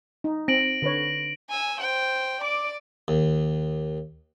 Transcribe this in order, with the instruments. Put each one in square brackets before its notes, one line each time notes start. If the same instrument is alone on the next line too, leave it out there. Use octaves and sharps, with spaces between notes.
[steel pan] D#4
[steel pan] C4 [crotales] A#6 D7 F#7
[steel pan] D3 B4 C#5
[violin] G#5 E6
C5 G5
D5 D6
[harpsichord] D#2